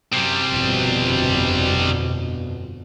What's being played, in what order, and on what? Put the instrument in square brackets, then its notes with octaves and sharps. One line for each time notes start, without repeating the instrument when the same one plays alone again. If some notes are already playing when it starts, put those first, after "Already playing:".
[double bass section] F#2 [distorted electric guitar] C3 G3
[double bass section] G1 F2 B2